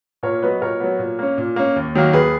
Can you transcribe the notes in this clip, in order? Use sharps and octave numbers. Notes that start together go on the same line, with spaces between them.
A#2 A#4 C#5
F#3 B3 B4 D#5
A#2 A#4 C#5
F#3 B3
A#2
A#3 C#4
A#2
A#3 C#4
D#2
D#3 F#3 A#3
D#2 G#4 B4